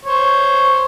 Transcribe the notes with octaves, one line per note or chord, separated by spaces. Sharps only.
C5 C#5 C#6